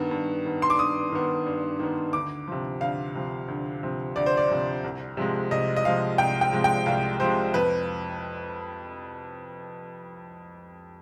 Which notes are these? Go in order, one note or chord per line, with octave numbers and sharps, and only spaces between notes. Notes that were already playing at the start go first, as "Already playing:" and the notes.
Already playing: G2 D#3 B3
G2
D#3 B3
C6
D6
G2 D#6
D#3 B3
G2
D#3 B3
D2 D6
C3 F3
D2 F5
C3 F3
D2
C3 F3
D2 D5
C5
D5
C3 F3
C2
C3 F3 G#3
C2 D#5
D#5
C3 F3 G#3 F5
C2 G5
G5
C3 F3 G#3
G5
C2 F5
C3 F3 G#3 C5
F2 B4